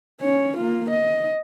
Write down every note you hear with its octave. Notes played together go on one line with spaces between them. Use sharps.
C#4 C#5
A#3 F4
D#5